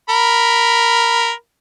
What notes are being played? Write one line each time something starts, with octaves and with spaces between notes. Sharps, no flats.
A#4 B5